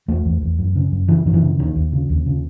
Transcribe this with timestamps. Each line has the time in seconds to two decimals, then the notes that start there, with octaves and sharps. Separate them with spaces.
0.08 E2 A3
0.26 E2
0.42 E2
0.59 F#2
0.76 C#3
0.92 F#2
1.08 C#3 E3
1.25 F#2 D#3
1.34 E3
1.42 C#3
1.59 D#2 D#3
1.76 D#2
1.92 C#3
2.10 D#2
2.26 C#3